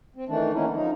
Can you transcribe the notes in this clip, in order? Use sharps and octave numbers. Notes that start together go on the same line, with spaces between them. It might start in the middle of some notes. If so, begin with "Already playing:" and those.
C4
D#3 E3 A3 D4
D3 D#3 G#3 A#3 C#4 E4
F3 D#4